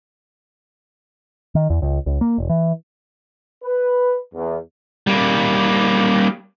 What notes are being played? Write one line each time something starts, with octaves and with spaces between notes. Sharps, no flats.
D#3
E2
C#2
C#2
A#3
E1
E3
B4
E2
G3 A#3